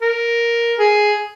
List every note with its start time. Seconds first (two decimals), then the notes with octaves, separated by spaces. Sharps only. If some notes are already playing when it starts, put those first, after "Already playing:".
0.02 A#4
0.79 G#4